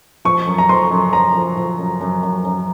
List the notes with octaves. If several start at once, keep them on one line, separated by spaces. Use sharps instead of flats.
F3 C#6
F#2
A#5
F3 C6
F#2
F#2 A#5
F3
F3
F#2
F#2
F#2
F#2